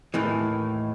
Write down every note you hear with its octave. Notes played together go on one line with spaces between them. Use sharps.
D#2 A2 D#3 E3